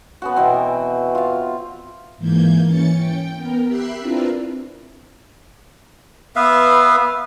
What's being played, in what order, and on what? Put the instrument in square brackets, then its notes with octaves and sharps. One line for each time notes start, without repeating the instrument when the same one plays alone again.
[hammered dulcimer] B3 C#4 F#4
B2 E3 C4
F4 F5
[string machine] G#2 E3 A#3 G6 G#6
E3 C#4 A6 C#7
G5
B3 A#4
G4 E5 B5 E6 F#6 C7
C4 D4 E4 F4 A#4 B4
[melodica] B3 B4 E5 F5